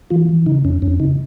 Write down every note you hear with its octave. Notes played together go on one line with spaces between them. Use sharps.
E3 F4
E3
C#3 D#4
F2 C#4
F2 C#4
C#3 D#4